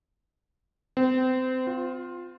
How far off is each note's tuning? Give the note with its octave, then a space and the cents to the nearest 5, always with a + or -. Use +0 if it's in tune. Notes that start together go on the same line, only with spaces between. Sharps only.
C4 -30
F4 +15